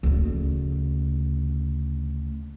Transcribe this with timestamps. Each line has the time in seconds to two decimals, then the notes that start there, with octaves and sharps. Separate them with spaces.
0.03 D2 C#3